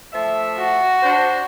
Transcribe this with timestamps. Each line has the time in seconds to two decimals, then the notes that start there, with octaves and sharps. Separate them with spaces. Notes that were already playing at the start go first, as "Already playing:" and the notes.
0.13 F3 A3 E5
0.58 F#4
1.03 D4 C5